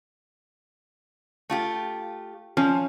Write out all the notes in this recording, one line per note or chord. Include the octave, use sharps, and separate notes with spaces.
A3 F4 G4
F3 C#4